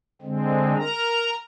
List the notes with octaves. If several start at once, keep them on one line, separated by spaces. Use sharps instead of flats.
D3 G#3 C4
A#4 A#5